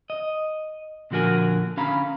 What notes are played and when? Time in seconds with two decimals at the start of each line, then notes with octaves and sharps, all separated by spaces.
0.10 D#5
1.11 A#2 D3 F3 F#4 A#4 G#5
1.77 D3 C#4 F5 A#5 B5